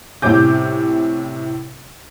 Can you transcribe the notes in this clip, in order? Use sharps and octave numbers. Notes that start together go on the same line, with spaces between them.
A2 C3 G3 C#4 D6 G6